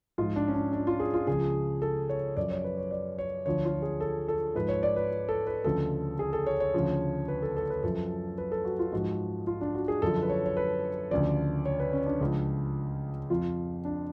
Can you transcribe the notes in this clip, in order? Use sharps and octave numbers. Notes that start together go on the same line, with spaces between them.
G#2 F3 F4
D4
C#4
D4
D4
F4
G#4
F4
C#2 C#3 F3 G#4
A4
C#5
F#2 F3 D5
C#5
B4
C#5
D5
C#5
D2 D3 F3 C#5
F4
G#4
A4
A4
G#2 F3 B4
C#5
D5
B4
A4
B4
D2 C#3 F3 A4
G#4
A4
C#5
C#5
D2 C#3 F3
B4
A4
A4
B4
F#2 F3 A4
B4
A4
F#4
F4
G#2 F3 F#4
F4
D4
F#4
G#4
F#2 D3 F3 A4
B4
C#5
C#5
B4
D2 C#3 F3 D5
C#5
B4
C#4
D4
C#2 C#3 F3
F2 F3 F4
D4